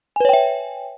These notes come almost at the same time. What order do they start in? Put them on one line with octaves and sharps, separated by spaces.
G#5 B4 C#5 G5 E5